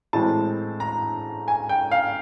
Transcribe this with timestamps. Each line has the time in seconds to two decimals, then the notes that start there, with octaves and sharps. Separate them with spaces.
0.13 A2 E3 G#3 C4 A5
0.80 A#5
1.48 G#5
1.69 G5
1.91 F5